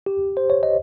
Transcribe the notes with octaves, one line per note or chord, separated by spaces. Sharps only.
G4
C5
C#5
D#5